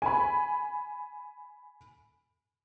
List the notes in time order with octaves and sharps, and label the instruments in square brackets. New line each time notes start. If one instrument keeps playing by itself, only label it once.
[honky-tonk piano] G#5 B5